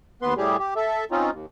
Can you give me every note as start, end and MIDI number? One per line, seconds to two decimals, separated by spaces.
0.22 0.34 39
0.22 0.34 59
0.22 0.34 71
0.22 0.34 84
0.37 0.57 45
0.37 0.57 55
0.37 0.57 67
0.37 0.57 68
0.59 0.74 67
0.76 1.05 69
0.76 1.05 76
1.11 1.31 60
1.11 1.31 61
1.11 1.31 63
1.11 1.31 65
1.31 1.46 39